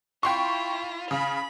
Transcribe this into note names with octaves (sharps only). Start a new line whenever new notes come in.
E4 F4 G5 C6 C#6
C#3 B5